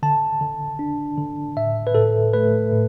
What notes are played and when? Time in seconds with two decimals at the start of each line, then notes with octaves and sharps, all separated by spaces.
0.03 D3 A5
0.41 D3
0.79 D4
1.18 D3
1.57 A2 E5
1.87 B4
1.95 A2 A4
2.34 A3 B4
2.72 A2